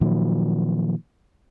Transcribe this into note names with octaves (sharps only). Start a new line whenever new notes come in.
A#2 D#3 F3 F#3